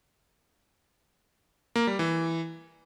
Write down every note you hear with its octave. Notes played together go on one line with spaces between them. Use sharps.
A#3
G3
E3